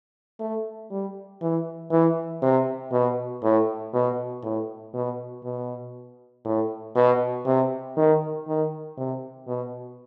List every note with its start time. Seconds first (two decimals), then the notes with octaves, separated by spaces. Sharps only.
0.40 A3
0.91 G3
1.42 E3
1.91 E3
2.42 C3
2.92 B2
3.43 A2
3.94 B2
4.43 A2
4.94 B2
5.44 B2
6.45 A2
6.96 B2
7.46 C3
7.97 D#3
8.48 D#3
8.97 C3
9.47 B2